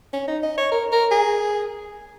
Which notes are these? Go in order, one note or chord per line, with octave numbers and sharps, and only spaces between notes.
C#4
D#4
D#5
C#5
A#4
A#4
G#4